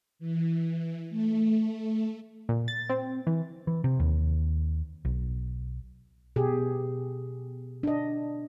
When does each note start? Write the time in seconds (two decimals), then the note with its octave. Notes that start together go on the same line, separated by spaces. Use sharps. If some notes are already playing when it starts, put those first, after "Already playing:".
0.19 E3
1.10 A3
2.49 A#2
2.68 A6
2.89 C4
3.27 E3
3.67 E3
3.84 C3
4.00 D#2
5.05 B1
6.36 B2 G4 G#4
7.83 D4 D#5